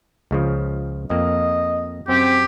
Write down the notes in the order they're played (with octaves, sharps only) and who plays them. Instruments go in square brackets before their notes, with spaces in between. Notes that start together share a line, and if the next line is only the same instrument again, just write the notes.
[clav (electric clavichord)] C#2 C#3 F3
[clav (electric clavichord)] F2 A#3 [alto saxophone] D#5
[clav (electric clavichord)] F#2 G5 [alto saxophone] C4 [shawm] G4